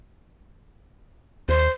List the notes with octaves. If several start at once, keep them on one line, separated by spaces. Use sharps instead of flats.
D#2 C5